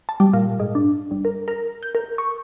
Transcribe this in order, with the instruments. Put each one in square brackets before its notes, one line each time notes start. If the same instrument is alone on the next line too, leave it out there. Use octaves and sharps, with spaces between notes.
[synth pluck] A5
G3
A#2
G#2
D4
G1
A#4
A#4
G6
A#4
C#6